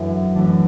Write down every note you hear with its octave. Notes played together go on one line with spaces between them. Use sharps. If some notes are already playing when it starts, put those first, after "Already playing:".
Already playing: F#2 E3 A3 D4
F#2 E3 A3 D4